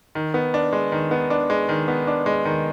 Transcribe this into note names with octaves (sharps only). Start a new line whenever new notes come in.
D#3
B3
D4
G#3
D#3
B3
D4
G#3
D#3
B3
D4
G#3
D#3